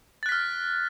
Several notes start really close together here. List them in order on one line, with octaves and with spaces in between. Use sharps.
A6 F#6 B6 F6